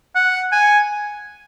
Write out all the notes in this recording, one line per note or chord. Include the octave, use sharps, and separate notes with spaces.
F#5
G#5